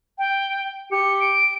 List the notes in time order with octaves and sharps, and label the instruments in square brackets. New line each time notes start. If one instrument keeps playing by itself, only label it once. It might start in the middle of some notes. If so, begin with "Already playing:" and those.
[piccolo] G5
[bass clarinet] G4 [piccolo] C#7
[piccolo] D7